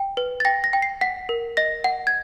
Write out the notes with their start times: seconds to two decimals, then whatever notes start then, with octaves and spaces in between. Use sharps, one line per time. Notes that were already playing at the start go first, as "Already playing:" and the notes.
Already playing: G5
0.17 B4
0.40 A6
0.45 G5 A#6
0.64 A#6
0.73 G5
0.82 C7
1.01 F#5 B6
1.29 A#4
1.57 D#5 A#6
1.84 F#5
2.07 G#6